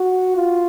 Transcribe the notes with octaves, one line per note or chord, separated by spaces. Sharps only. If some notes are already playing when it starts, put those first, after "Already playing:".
Already playing: F#4
F4